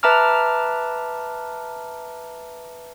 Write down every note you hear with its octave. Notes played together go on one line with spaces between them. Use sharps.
B4 E5 A5 A#5 D6 F6